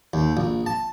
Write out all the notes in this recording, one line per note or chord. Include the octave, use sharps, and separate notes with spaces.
D#2
A#1
A5